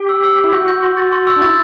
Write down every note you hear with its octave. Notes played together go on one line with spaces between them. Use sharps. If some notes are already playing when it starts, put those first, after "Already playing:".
Already playing: G4
E6
E6
E6
E4
F#4 G6
G6
C6
A6
C6
E6
D4
E4 A6